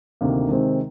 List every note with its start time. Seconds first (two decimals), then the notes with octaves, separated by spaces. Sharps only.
0.21 D2 C3 D#3 A#3
0.49 C3 D#3 G#3 C4